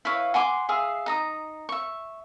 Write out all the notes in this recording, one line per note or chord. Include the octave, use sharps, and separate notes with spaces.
E4 B4 C#5 F5
F#5 G#5 C6 D6
G#4 E5 F5
D#4 A#5 D#6
E5 C#6